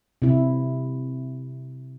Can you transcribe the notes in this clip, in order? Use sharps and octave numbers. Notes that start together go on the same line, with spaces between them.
C3 E4